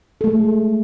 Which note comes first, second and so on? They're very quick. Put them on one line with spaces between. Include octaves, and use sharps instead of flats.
A4 A3 G#3